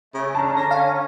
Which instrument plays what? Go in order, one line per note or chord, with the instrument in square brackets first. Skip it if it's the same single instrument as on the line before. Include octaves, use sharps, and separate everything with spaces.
[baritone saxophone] C#3 [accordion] A3
[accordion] C#4 D4 [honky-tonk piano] A5 A#5
[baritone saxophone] D3 [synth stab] A#6
[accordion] C#4 [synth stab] F5